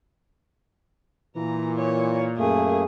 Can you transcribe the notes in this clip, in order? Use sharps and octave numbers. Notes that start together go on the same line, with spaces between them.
A#2 E3 A#5
C#5
F#2 A3 A#3 G#4